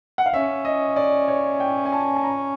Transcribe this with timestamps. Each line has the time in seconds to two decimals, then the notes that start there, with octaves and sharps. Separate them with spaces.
0.18 F#5
0.26 F5
0.34 C#4 E5
0.65 D#5
0.96 D5
1.28 C#5
1.60 G5
1.85 G#5
1.92 A5
2.16 A5
2.23 A#5